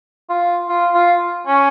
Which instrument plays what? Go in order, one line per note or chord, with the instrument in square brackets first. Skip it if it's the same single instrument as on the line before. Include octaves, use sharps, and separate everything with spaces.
[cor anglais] F4
F4
F4
C#4